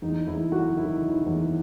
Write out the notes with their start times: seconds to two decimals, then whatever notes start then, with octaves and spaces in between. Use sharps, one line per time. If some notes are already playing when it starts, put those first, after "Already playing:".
0.02 E2 D#4
0.27 E2 E4
0.52 F#3 F#4
0.77 D#3 E4
1.02 D#3
1.14 E4
1.26 E2